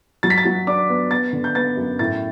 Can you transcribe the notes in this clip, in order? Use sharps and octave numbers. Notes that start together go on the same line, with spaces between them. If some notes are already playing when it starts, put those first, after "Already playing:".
F#3 A6
B6
A6
F#3
D4 D6
B3
B3 A6
D3
G6
B3 A6
F#2
A2 A6